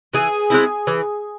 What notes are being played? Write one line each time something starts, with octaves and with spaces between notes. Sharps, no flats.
E3 G#4
G#3 C4 E4
E3